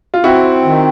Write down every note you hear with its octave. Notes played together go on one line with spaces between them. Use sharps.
F4
C4 E4 F#4
D#3